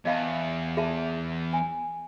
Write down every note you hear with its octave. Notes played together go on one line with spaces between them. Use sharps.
E2 D#5 F5 A5
G#4 E5 A5
G#5